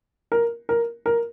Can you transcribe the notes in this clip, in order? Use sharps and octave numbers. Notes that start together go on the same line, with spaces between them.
A#4
A#4
A#4